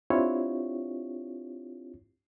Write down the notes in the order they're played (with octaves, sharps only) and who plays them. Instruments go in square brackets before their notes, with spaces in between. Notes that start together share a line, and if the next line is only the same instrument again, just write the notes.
[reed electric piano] C4 D4 E4 F4 G4 C#5